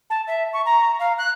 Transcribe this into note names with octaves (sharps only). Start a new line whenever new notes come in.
A5
E5
C#6
A#5
F5
F#6